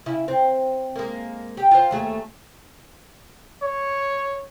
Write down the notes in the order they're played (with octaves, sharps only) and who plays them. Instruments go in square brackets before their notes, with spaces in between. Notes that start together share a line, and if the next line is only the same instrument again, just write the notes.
[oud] C#3 E4
C4
G#3 A#3
G4
F4 C5
D#2 A3 G#4
[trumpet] C#5